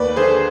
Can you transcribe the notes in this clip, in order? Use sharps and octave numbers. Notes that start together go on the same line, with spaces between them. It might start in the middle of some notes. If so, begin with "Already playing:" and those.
Already playing: D#2 B4 D5
D3 G#4 C5